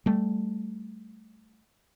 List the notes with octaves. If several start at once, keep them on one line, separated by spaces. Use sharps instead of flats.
G3 A3